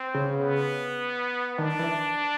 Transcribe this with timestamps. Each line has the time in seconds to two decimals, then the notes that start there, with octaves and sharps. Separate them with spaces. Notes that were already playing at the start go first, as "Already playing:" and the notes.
Already playing: C4
0.14 C#3
0.35 B3
1.58 D#3 D4
1.79 E3